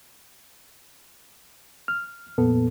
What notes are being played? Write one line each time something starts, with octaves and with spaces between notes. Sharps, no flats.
F6
F2 A#2 B3 A4